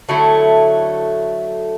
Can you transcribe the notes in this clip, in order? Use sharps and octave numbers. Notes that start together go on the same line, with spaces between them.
D3 F#3 A3 E4